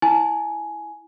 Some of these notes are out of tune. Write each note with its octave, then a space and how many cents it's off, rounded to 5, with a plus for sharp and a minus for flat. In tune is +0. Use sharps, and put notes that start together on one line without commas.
E4 +0 G#5 +15